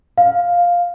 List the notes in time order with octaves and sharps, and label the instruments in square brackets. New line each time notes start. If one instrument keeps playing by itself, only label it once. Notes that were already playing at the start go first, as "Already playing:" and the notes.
[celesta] F5